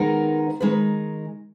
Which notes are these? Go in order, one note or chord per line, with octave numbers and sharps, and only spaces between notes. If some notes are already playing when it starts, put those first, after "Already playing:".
Already playing: D#3 G#3 B3 D#4 A#4
D#3 G#3 D#4 B4